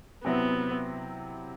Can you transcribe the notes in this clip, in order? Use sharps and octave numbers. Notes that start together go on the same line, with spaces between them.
C3 F#3 B3 C4 E4